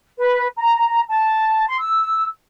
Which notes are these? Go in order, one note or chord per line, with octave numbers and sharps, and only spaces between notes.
B4
A#5
A5
C6
E6